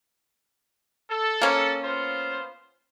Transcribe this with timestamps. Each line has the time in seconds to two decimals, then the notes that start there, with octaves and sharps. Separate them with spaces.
1.11 A4
1.42 A#3 C#4
1.83 B3 F4 C5